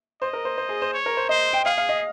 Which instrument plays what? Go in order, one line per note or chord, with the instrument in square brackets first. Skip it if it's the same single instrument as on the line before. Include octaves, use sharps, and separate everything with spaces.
[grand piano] C5 [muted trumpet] D#5
[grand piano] A#4
C5
C5
G#4
C5
[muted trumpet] C#5
[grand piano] A#4
C5
[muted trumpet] C5 [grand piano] D#5
[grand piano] G5
[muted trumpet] G#4 [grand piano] F5
[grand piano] F5
D#5